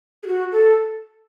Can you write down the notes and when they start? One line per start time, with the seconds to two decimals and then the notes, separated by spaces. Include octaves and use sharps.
0.23 G#4
0.27 F#4
0.52 A4